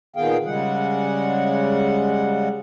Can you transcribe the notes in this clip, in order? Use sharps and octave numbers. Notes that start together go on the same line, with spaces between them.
A#2 D#3 B3 G#4 F5 G5
C#3 G3 G#3 F#5